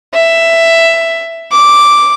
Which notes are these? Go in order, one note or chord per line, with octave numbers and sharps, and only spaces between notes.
E5
D6